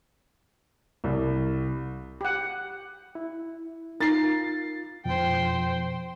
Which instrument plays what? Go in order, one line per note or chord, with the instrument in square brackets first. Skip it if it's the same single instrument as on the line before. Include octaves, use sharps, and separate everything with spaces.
[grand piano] C2
[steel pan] G4 F#5
[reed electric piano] E4
[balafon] D#4 [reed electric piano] F4 [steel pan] A#4 [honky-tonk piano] A6 C7
[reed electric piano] F2 B2 F3 [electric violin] C5 G5